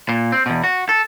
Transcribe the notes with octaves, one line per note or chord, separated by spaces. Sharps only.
A#2
C4
E2 B2
F#4
A4